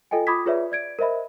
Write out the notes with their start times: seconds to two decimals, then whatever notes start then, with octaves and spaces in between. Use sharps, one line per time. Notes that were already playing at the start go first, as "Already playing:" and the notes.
0.11 F4 A4 D#5 G5 G#5
0.27 F4 B5 D6 D#6 G#6 B6
0.46 F4 G#4 B4 C#5 D5 E5
0.72 D5 G#6 D7
0.99 A#4 C5 D#5 E5 B5